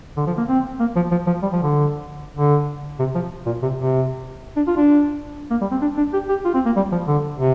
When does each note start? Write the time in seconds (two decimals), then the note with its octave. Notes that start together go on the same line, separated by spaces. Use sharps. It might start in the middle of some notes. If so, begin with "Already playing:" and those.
0.17 D3
0.27 F3
0.38 A#3
0.49 C4
0.80 A#3
0.96 F3
1.11 F3
1.27 F3
1.42 G3
1.53 F3
1.63 D3
2.37 D3
2.99 C3
3.15 F3
3.46 A#2
3.62 C3
3.78 C3
4.56 D4
4.67 F4
4.77 D4
5.51 A#3
5.61 G3
5.71 C4
5.82 D4
5.98 D4
6.13 G4
6.29 G4
6.45 F4
6.54 C4
6.66 A#3
6.76 G3
6.92 F3
7.07 D3
7.39 C3